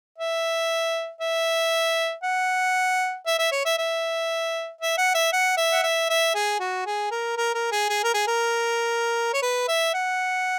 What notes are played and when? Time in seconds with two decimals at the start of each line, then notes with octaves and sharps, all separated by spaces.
0.18 E5
1.21 E5
2.24 F#5
3.27 E5
3.39 E5
3.52 C#5
3.65 E5
3.78 E5
4.81 E5
4.98 F#5
5.14 E5
5.33 F#5
5.57 E5
5.72 F#5
5.83 E5
6.10 E5
6.35 G#4
6.60 F#4
6.86 G#4
7.11 A#4
7.37 A#4
7.55 A#4
7.72 G#4
7.89 G#4
8.04 A#4
8.14 G#4
8.27 A#4
9.33 C#5
9.42 B4
9.68 E5
9.94 F#5